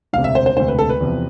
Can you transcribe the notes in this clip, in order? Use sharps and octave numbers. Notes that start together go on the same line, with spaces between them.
E1 D2 C3 F5
E5
C5
C5
E1 D2 C3 C5
B4
A4
B4
E2 C3 F3